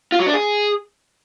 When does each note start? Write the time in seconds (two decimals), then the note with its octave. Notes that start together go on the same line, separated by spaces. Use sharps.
0.12 F4
0.19 F#3
0.26 D4
0.34 G#4